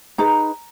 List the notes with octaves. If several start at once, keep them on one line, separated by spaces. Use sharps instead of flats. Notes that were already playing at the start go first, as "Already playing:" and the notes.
D#4 G#4 B4 A#5